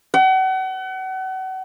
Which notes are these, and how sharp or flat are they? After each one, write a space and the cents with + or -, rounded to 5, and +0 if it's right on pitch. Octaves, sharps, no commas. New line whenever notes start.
F#5 +35